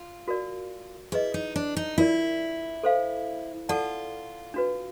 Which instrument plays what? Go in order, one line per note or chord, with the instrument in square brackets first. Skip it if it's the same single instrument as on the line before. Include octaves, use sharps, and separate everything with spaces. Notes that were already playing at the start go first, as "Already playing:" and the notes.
Already playing: [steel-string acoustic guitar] F4
[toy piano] F#4 A#4 D5
[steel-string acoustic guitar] E4 [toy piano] G#4 B4 D#5
[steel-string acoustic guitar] D#4
D4
D#4
[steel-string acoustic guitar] E4 [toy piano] F4 A#4 D5
[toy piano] A4 C5 F5
[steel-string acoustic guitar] F4 [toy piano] A4 D5 F#5 A5
[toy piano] D4 F#4 B4